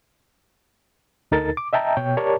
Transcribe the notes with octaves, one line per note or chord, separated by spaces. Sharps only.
D2 D#4 A4 A#4 A6
D6
D#5 E5 G5 A5 A#5
B2 C#5 G5
G4 A#4 C#5 D5 A5